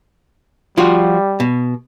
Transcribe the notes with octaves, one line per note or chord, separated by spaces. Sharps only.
F3 G3 F4 F#4
B2